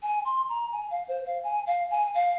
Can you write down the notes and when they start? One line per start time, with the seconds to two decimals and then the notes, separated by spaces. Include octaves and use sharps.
0.02 G#5
0.25 C6
0.49 A#5
0.72 G#5
0.90 F5
1.08 C5
1.26 F5
1.43 G#5
1.66 F5
1.90 G#5
2.14 F5